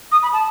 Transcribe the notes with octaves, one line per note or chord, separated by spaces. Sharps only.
D#6
B5
A5